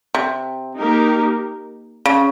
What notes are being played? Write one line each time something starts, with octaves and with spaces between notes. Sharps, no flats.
C3
A#3 D#4 G4 A#4
C#3